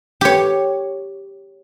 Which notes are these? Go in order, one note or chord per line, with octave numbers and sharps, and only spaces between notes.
G4 C#5